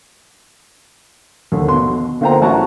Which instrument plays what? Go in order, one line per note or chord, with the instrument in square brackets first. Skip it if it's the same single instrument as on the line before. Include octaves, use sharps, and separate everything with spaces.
[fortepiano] D#2 D3
B2 C6
D3 A#3 F4 C5 G5 A#5
A1 F#3 F#5 A5 A#5 C#6